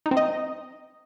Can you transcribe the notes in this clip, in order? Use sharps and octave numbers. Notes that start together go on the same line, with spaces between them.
D#4
C4
D#5